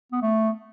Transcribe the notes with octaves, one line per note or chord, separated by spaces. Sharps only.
B3
A3